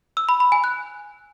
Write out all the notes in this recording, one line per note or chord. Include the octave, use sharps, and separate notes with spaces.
E6
B5
B5
G#5
F#6